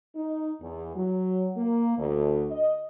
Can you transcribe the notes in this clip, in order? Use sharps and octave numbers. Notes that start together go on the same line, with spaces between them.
D#4
E2
F#3
A#3
D2
D#5